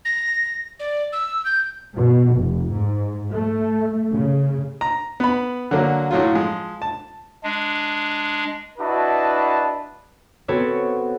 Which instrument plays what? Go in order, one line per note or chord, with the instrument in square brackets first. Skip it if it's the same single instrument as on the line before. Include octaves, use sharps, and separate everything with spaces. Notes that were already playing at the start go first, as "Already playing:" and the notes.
[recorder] A#6
D5
E6
G6
[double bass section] B2
F1
G#2
A3
C#3
[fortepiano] A#5
B3 B5
D3 F#3 A#3
A2 F#3 F4
F3 G#3
A5
[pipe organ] G#3 D4
[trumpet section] D4 E4 F#4 B4 D#5 A5
[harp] B3 C4 F#4 A4 B4 C#5